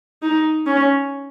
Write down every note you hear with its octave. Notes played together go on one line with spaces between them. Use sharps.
D#4
C#4